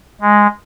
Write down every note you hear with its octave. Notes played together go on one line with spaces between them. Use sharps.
G#3